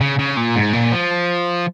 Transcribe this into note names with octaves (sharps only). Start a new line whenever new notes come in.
C#3
C#3
A#2
G#2
A#2
F3